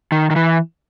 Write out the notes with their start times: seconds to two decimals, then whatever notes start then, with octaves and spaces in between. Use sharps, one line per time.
0.12 D#3
0.30 D#3
0.36 E3